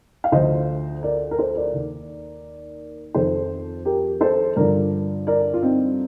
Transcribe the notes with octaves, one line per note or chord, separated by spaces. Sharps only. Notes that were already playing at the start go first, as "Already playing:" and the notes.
F5
D2 D3 F3 C5 D#5
A#4 D5
A#4
A4 C5
A#4 D5
D#2 D#3
F2 D#3 A4 C5
G4 A#4
A4 C5
G2 D3 F3 A#4 D5
A#4 D5
F4
C4 D#4